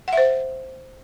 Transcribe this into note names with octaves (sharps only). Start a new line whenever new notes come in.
C5 E5 F#5